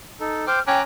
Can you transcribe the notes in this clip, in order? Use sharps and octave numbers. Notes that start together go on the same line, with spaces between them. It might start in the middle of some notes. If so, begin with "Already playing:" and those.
D#4 A4
C5 G5 D6 F6
C#4 G5 A#5 D6 F#6